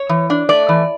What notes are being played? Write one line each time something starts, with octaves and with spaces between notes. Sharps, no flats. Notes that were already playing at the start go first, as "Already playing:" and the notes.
Already playing: C#5
E3
D4
A3 D5
E3